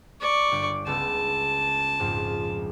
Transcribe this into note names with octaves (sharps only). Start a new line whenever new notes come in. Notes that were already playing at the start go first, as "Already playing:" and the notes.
D5 C#6
G1 D6
C#2 B3 A5 E6
A#1 F2 G#2